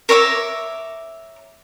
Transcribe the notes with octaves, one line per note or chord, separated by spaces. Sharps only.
A#4 C#5 E5 D6